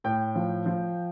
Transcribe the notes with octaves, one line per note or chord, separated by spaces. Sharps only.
A2 G5
F3
F3